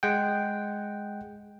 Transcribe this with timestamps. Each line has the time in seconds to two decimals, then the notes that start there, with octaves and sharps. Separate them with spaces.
0.03 G#3 F#5 G5